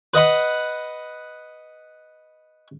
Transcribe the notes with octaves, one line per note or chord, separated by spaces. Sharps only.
B4 D#5 F#5 B5